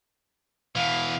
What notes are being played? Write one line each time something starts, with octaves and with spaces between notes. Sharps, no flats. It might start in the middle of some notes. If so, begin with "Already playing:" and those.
B2 E3 F5